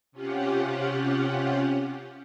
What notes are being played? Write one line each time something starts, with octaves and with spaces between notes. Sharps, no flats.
C3 C#4 F4 G4 F#5